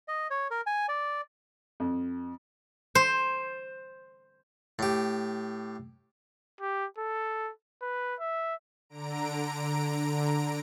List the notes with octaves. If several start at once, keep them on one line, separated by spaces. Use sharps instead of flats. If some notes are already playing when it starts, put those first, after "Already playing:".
D#5
C#5
A#4
G#5
D5
F2
C5
A2 G4
G4
A4
B4
E5
D3 A#5 D7